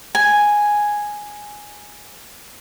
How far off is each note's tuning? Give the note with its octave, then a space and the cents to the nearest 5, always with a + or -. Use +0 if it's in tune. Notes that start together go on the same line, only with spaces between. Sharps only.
G#5 +0